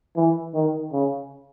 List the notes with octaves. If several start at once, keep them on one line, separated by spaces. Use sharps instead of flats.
E3
D#3
C#3